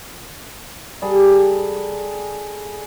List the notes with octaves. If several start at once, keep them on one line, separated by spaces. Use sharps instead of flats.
G3 G#4 A4